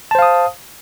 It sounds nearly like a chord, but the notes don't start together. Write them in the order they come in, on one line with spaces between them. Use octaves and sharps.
A5 C5 F5 D#6